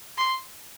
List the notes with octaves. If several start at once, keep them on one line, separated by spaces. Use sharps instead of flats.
C6